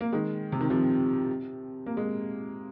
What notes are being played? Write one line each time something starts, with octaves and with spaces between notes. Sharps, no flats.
A#3
D#3 G#3
C3
D#3
C3 F3
A#3
G#3